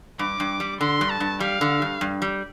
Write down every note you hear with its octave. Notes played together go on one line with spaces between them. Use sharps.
G2 D6
G2
G3
D3 C6
G2
A5
G2
G3 F5
D3
G2
G2
G3